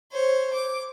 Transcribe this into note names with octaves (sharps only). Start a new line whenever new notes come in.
C5 C#5
D6